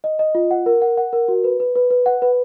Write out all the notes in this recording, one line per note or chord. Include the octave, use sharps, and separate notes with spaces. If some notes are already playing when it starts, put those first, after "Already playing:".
D#5
D#5
F4
F#5
A#4
F#5
F#5
A#4
F#4
B4
B4
B4
B4
F#5
B4